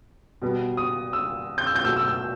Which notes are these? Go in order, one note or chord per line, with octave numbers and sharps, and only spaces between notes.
B2 G3 B3
D#6
E6
G6
E6
G6
B2 F#3 A3 E6
E6
E6